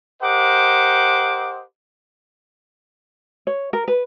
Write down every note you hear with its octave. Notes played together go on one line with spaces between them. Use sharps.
G4 A#4 C5 D#5 F#5 D6
C#5
A#4
B4